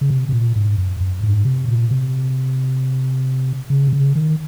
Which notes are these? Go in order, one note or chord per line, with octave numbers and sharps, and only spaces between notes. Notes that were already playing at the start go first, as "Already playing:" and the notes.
C#3
C3
C3
A#2
G#2
F#2
F#2
G#2
C3
A#2
C3
C#3
C3
C#3
D#3